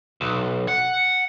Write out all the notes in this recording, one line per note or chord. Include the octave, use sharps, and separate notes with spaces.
B1
F#5